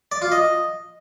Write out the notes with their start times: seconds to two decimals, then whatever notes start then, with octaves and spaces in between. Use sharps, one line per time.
0.12 D5
0.22 F4
0.32 D#5